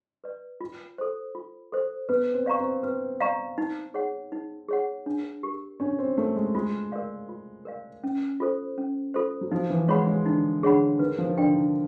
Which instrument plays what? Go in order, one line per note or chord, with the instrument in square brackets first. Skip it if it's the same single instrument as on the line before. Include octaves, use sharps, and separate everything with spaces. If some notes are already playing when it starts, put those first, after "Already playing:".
[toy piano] B4 D5
F4
A4 C5
F4
A4 C5
[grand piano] B3 [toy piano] B4
[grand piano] C4
[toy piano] D5 F5 A#5 C#6
[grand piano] C4
[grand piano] C4 [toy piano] B4
[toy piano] D5 F5 A#5 C#6
D#4
G#4 C#5 F#5
D#4
G#4 C#5 F#5
D4
G4 A#4
[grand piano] C#4 [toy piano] D4
[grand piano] C4
[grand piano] A3 [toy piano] G4 A#4
[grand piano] G#3
[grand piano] G#3 [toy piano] F4
[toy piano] A#4 D5 F5
F4
A#4 D5 F5
C#4
F4 A4 C5
C#4
F4 A4 C5
[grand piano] F#3
[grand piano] F3 [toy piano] D#4
[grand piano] E3
[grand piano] G#3 [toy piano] G#4 C#5 F#5 B5
[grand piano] G#3
[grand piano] D3 [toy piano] D#4
[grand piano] D3 [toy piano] G#4 C#5 F#5 B5
[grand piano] D#3 [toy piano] B4
[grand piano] F3
D#3
[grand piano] D3 [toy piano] D5 G5
[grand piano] D#3